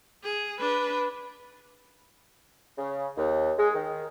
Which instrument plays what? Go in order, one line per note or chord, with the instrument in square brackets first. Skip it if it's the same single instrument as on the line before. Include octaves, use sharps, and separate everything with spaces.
[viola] G#4
D4 B4
[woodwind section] C#3
D#2
G#3
D#3